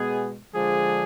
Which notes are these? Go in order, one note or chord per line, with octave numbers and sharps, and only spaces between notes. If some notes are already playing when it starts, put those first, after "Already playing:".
Already playing: B2 G#3 B3 G#4
D3 F3 G#3 D4 G#4